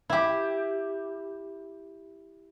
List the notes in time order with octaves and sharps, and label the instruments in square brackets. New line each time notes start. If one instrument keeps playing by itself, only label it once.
[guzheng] E4 G4